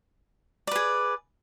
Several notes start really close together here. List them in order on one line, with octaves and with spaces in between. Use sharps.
D5 B4 G#4